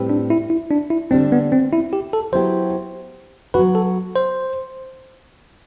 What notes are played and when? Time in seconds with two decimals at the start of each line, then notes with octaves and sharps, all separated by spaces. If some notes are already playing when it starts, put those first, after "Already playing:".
Already playing: A2 G3 C4 G4 B4
0.10 D4
0.30 E4
0.50 E4
0.71 D4
0.90 E4
1.11 D3 G3 C4 D4
1.32 B3
1.52 C4
1.73 E4
1.93 G4
2.13 A4
2.32 F#3 B3 E4 G4 C5
3.54 F#3 B3 F#4 B4
3.75 A4
4.15 C5